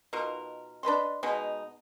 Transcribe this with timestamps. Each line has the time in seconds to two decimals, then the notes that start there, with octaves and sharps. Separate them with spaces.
0.13 B2 D#4 F4 A#4
0.83 D4 B4 D#5 C6
1.23 B2 G#3 B3 D#4